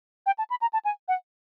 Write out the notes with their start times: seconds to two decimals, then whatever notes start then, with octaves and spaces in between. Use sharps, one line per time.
0.26 G5
0.38 A5
0.50 B5
0.61 A#5
0.73 A5
0.85 G#5
1.08 F#5